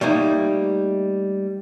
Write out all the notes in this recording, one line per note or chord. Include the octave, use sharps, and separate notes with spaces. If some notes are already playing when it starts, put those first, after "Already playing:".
G3 A3 A#3 D#4